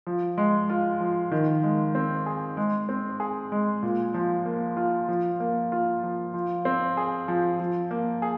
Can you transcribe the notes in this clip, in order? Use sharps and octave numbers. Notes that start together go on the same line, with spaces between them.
F3
G#3
F4
F3
D#3
G#3
C4
G#4
G#3
C4
G#4
G#3
A#2
F3
A#3
F4
F3
A#3
F4
F3
F3
C4
G#4
F3
F3
A#3
G#4